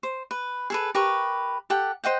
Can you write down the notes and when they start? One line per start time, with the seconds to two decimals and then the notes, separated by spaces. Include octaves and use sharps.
0.03 C5
0.31 B4
0.70 G#4 A4 B4
0.95 G4 A#4 B4 C#6
1.70 G4 A4 F#5 G5
2.04 C5 D#5 F#5 G5